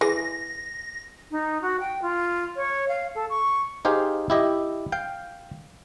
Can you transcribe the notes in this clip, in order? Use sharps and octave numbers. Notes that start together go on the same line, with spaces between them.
E3 G#4 A#6
D#4
F#4
G5
F4
C#5
F5
A4
C#6
D#4 G4 G#4 C5 F5
E4 G4 D#5
F5 G5